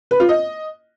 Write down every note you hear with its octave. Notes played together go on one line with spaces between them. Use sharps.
B4
F4
D#5